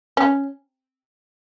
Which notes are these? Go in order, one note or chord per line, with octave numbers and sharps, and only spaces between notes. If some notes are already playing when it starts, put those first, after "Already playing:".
C#4